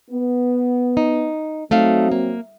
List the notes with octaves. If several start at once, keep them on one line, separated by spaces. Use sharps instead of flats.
B3
D#4
F#3 A3 C4 D#4 F5
A#3